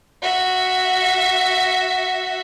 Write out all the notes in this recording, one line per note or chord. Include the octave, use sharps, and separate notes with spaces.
F#4 E5